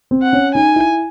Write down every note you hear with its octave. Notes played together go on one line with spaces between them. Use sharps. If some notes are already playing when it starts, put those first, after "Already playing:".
C4
F#5
C#4
D#4 G#5
E4